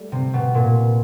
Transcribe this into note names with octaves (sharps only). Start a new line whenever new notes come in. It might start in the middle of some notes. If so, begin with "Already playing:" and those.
Already playing: G3 A3
C3
B2
A#2